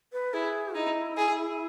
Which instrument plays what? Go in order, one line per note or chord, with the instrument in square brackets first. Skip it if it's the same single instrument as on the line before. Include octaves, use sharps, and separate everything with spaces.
[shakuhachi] B4
[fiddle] E4 [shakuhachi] G#4
[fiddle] D#4 [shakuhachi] E4
[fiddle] G#4